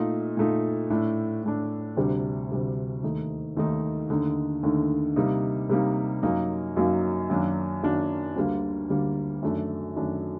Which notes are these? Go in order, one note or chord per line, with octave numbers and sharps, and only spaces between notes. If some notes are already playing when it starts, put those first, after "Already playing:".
Already playing: A#2 A3 D#4
A#2 A3 D#4
A2 A3 D4
A2 A3 D4
D2 C3 G3 D4
D2 C3 G3 D4
D#2 D#3 A3 D#4
D#2 D#3 A3 D#4
D#2 D3 A3 D#4
D#2 D3 A3 D#4
C3 G3 A#3 D#4
C3 G3 A#3 D#4
F#2 F#3 A#3 D#4
F#2 F#3 A#3 D#4
F#2 D#3 F#3 A#3 D4
F#2 D#3 F#3 A#3 D4
D2 D3 G3 A#3
D2 D3 G3 A#3
F#2 D#3 A3 D4
F#2 D#3 A3 D4